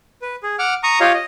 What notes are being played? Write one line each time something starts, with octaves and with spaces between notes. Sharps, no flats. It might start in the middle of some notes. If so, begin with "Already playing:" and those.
B4
G#4
F#5 D6 F6
A#5 C#6 D#6
F4 G4 C#5 D#5 F5
D#5